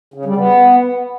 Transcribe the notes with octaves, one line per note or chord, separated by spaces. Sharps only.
C#3
G3
B3